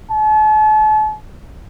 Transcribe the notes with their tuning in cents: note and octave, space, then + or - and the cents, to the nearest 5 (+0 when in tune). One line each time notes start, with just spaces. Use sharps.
A5 -40